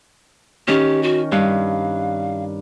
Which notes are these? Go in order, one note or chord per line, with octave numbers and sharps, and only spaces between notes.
D#3 C#4 G4
F#4
G2 F5